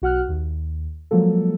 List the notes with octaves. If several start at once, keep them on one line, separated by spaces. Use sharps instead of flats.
B1 F#4 F#5 F6 F#6
D#2
F3 F#3 G#3 A#3 A4